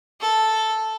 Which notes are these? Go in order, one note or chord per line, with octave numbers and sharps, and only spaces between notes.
A4